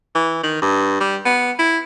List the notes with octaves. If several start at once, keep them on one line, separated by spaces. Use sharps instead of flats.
E3
D#3
G2
G3
B3
E4